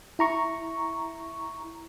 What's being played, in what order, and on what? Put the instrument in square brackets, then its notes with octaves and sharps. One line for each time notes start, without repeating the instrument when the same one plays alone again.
[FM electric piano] E4 A#5 C#6